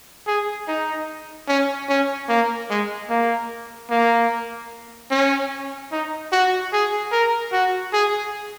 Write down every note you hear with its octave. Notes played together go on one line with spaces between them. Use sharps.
G#4
D#4
C#4
C#4
A#3
G#3
A#3
A#3
C#4
D#4
F#4
G#4
A#4
F#4
G#4